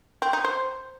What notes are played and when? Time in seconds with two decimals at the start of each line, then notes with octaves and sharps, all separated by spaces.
0.22 C4
0.33 D#4
0.44 C5